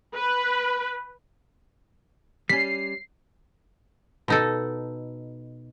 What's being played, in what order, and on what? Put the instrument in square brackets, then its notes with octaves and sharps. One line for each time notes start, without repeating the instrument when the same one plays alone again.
[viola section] B4
[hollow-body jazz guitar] G3 C#4 [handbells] B6 [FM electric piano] C7
[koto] B2 D#4 A4